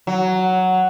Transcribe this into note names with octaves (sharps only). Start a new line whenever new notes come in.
F#3